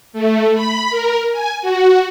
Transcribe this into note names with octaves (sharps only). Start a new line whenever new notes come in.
A3
B5
A#4
G#5
F#4